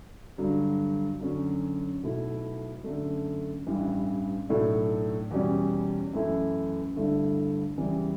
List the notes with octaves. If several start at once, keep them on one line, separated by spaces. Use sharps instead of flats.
G2 D3 F#3
F#2 D3 F#3 C#4
B1 B2 A3 E4
F#2 D3 A3
A1 G2 E3
B1 A2 F#3 A3 D4
E2 B2 G3 C#4
F#2 E3 A3 E4
G1 G2 D3 A3 E4
E2 C#3 E3 G3